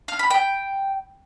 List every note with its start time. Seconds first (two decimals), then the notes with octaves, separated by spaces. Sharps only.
0.08 F5
0.19 B5
0.30 G5